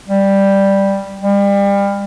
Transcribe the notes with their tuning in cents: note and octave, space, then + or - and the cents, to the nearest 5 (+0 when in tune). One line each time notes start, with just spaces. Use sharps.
G3 +5
G3 +30